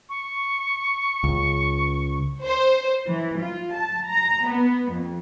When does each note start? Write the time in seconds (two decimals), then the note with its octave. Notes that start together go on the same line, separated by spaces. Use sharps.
0.09 C#6
1.24 C#2
2.43 C5
3.07 E3
3.40 F4
3.74 A5
4.07 A#5
4.47 B3
4.91 F2